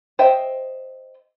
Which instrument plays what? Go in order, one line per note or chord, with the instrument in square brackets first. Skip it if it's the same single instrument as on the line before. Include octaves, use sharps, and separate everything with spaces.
[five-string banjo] C5 D#5 E5 G5